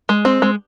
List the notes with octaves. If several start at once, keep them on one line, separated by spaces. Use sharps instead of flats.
G#3
C4
G#3